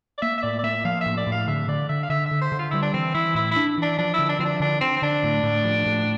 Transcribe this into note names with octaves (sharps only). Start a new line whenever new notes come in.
D5
A#3 E5
E5
A2 D5
D5
A#3 E5
F3 F5
E5
A2
D5
A2
F5
D3 E5
D3 D5
D3 E5
F5
D3 E5
E5
D3
C5
D3
F4
G3 E4
D4
E3 C4
E3 E4
A2 E4
E4
D4
E3 D4
F3 D4
E4
D3
D4
F3 C4
D4
D3 D4
D3 C4
C4
D3 D4
A2
A2
F3
A2